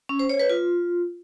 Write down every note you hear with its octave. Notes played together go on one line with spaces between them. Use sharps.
C#4
C5
C#5
B4
F4